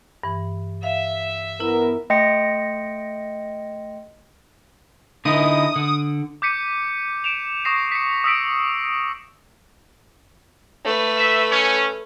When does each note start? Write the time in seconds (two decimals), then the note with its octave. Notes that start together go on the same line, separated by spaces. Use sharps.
0.23 G2 E3
0.83 E5 F5
1.60 B3 E4 A#4
2.10 A3 D#5 G5 C6 A#6 C#7
5.25 D3 D#4 E4 D#6
5.76 D3
6.42 D6 G6 B6 C#7 D#7
7.24 D7 E7 F7
7.65 C#6 D#6 A#6 C7 E7
7.92 B6 C#7
8.24 D#6 E6 B6 D7
10.85 A3 B4
11.17 E5
11.51 C#4